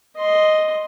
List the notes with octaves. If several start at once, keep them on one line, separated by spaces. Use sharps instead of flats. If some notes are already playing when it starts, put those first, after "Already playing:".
D#5 C6